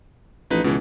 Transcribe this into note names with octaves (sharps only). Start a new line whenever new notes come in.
A1 F3 D#4 B4
C#2 B2 E3